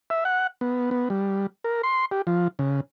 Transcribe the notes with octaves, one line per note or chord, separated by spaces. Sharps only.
E5
F#5
B3
B3
G3
A#4
C6
G4
F3
C#3